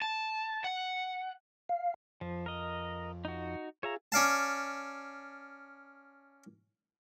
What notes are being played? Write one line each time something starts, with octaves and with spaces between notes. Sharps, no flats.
A5
F#5
F5
F2 F3
A#4 D#5
D#4 F#4
F4 G#4 C#5 E5 A#5
C#4 D5 F5 A5